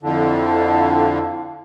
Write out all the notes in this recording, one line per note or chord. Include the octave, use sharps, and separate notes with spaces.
F2 D3 E4 F5 A5